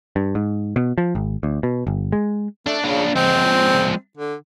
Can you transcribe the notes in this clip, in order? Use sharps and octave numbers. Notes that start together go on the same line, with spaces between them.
G2
G#2
B2
F3
G#1
D2
B2
G1
G#3
A3 D4
C#3 A#3 D4
F3 G#3 C4
D3